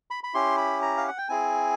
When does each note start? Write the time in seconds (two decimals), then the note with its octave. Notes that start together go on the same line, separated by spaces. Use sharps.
0.11 B5
0.24 B5
0.34 C#4 E4 G4 C6
0.57 B5
0.82 A#5
0.97 F5
1.08 F#5
1.18 G5
1.29 C4 E4 G#4 G#5